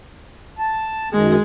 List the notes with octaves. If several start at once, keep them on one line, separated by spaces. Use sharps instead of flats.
A5
F#2 D#3 G#3